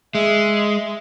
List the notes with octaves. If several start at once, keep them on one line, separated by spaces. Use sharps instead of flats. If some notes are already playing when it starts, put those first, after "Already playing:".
G#3 E5